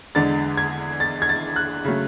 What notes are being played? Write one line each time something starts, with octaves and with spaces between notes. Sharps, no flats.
E2 D3 G#3 D4 A6
G#6
A6
G#6
A6
F#6
C#3 F#3 A3